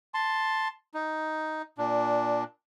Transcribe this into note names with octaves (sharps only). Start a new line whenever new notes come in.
A5 C6
D#4
A#2 D4